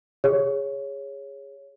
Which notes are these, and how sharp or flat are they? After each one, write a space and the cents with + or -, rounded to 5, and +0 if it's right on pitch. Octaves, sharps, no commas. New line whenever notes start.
G#4 -20 C#5 +0